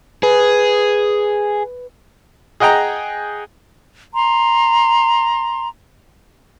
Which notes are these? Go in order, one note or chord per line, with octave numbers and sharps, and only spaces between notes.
G#4 B4
G#4 D#5 F#5 G5 A#5
A#5 C6